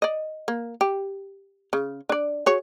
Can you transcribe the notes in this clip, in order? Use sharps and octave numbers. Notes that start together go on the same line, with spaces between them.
D5 D#5
A#3
G4
C#3
D4 D5
F#4 G#4 C#5